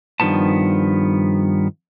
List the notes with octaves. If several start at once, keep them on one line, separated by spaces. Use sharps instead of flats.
G2 D#3 F3 B3 A5